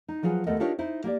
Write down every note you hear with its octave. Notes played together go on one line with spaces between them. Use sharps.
D#4
F3 F#3 F4 G#4 B4
D#2 A3 B3 A4 A#4 D#5
D4 D#4 F4 G4 A#4 C#5
D#4 E4 C5
A#3 G4 D5